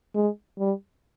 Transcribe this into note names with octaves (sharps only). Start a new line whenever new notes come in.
G#3
G3